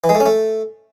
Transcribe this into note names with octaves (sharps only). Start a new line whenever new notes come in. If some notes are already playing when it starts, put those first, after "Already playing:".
E3
G#3
A3
C#4
A3